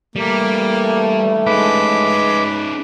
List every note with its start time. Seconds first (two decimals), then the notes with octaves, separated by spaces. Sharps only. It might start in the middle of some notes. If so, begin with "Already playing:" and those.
0.16 G2 E3 G3 A3 A#3
1.47 G#3 C#4 D#4 B4 D6